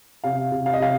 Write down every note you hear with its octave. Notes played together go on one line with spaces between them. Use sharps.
C3 F5
C3
F5
D#5
C3 F5